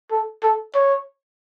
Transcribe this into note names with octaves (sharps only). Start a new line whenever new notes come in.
A4
A4
C#5